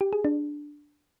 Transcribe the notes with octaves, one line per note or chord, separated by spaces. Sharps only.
G4
G#4
D4